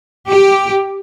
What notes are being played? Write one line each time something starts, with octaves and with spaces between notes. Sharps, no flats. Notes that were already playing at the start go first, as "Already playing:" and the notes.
G4